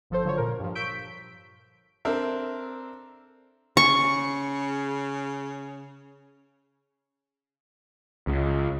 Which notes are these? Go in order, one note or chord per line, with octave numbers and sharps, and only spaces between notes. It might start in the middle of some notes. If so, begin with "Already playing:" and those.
G1 F3 A4 C5
D3 F#3 F4 C5 C#5
A#2 A#4
G2 F3
C#6 E6 G6 B6 D7
B6
C4 D4 A4 A#4 E5
C#3 C#6
C#2